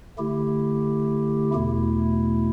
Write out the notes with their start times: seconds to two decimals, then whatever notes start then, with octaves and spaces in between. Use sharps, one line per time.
0.18 D3 A3 E4 G4
1.54 E2 B2 A3 E4